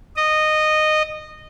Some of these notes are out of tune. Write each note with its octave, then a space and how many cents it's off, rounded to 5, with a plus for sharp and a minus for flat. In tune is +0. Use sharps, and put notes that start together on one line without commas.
D#5 -15